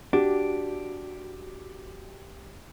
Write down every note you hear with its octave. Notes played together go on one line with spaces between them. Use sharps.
D4 F#4 G4